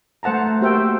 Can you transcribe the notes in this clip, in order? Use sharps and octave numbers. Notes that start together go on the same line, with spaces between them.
A3 C5 F#5 A5 A#5
A#3 F#4 G4 C5 E5 G5